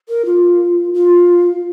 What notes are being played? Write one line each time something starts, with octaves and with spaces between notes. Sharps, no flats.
A#4
F4
F4